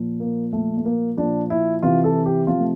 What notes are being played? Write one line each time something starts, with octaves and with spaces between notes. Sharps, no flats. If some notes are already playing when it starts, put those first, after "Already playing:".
Already playing: A#2 F3
A#3
A#2 F3 A3
A3
A#3
A#2 F3 D4
E4
C3 E3 F4
A4
G4
C3 F3 F4
A3